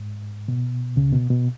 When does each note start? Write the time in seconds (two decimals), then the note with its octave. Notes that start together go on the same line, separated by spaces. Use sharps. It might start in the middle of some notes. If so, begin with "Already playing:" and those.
Already playing: G#2
0.48 B2
0.96 C#2 C#3
1.13 B2
1.30 B2